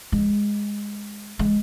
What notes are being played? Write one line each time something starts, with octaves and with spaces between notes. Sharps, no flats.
G#3
G#3